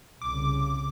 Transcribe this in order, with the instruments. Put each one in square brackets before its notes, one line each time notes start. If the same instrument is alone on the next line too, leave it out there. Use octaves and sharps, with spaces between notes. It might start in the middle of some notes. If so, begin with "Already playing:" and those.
[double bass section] C2 C#3 [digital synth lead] D6